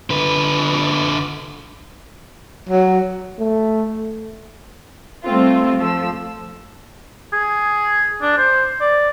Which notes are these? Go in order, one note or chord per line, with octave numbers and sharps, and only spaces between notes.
D3 B4
F#3
A3
G3 A3 C4 F4
F3 A3 E6
G#4
D4
C5
D5